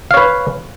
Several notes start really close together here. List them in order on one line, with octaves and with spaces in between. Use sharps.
F5 C#5 B4